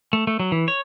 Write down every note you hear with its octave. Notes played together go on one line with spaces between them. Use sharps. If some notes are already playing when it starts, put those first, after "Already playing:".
A3
A3
F#3
E3
C#5